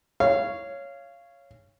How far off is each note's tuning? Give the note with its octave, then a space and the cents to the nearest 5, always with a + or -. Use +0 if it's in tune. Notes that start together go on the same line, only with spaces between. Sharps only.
C#5 +5 F5 -20